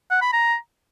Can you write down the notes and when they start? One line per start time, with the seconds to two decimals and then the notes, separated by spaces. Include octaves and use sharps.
0.11 F#5
0.22 B5
0.33 A#5